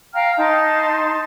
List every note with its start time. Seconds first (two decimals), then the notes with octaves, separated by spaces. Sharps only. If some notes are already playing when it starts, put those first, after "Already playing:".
0.13 F5 G5 A#5 F6
0.37 D#4 A5 C6